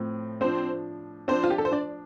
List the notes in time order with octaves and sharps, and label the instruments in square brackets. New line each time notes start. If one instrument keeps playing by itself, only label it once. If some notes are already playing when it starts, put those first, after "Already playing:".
Already playing: [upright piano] A2 F3 C4
[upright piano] F3 D4 [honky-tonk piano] C4 C5
[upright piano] F3 D4 [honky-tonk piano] C4 C5
[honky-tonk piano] F4
G4
A4
C5
D4 D5